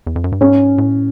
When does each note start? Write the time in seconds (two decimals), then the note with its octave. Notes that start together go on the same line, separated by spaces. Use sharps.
0.07 E2
0.16 F2
0.24 F#2
0.32 G2
0.41 G#2 C#4
0.78 A2